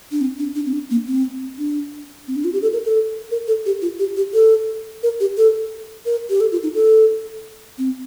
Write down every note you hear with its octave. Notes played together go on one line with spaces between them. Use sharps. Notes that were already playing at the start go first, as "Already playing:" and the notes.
D4
C4
D4
D4
C4
D4
A#3
C4
D4
C4
D4
F4
G4
A4
A#4
A4
A#4
A4
G4
F4
G4
G4
A4
A#4
G4
A4
A#4
G4
A4
F4
D#4
A4
C4